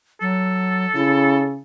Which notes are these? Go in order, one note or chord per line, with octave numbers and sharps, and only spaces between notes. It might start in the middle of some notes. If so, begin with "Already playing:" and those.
F#3 A4
C#3 E4